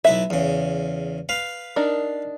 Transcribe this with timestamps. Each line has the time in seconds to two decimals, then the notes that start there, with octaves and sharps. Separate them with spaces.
0.05 B1 E4 B4 E5
0.30 E2 C#3
1.29 B4 F5
1.76 D4 D#4 A#4